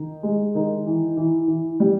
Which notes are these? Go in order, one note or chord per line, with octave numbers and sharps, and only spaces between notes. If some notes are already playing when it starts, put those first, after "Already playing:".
Already playing: D#3
G#3
D#3
E3
E3
E3
G3